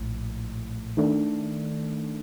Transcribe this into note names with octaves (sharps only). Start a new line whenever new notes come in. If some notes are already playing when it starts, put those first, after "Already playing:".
Already playing: A#1 A2
D#3 A3 D4